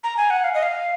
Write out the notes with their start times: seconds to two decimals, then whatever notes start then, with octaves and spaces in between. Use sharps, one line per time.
0.03 A#5
0.17 G#5
0.30 F#5
0.44 F5
0.54 D#5
0.63 F5